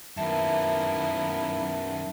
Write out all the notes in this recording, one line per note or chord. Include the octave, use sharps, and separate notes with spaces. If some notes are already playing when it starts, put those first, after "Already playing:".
F#2 D#3 A#3 B3 E4 E5 A5